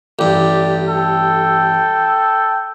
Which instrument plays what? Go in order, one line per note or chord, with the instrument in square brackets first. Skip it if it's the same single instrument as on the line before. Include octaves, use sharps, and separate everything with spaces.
[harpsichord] A1 G2 [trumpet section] G4 D5
[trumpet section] A4 G5